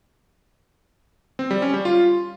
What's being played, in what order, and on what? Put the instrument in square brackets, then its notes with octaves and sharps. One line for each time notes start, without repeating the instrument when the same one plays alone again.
[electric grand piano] C4
G3
C#4
G3
F4